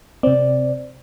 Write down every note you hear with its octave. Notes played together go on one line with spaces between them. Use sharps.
C3 C4 D5